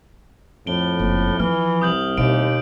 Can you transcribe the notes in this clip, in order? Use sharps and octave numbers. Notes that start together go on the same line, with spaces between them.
F2 A2 D7 G7
F#1
E3 F3 F6
C2 D#6 G6 F#7
D#2 B2 G#3 D7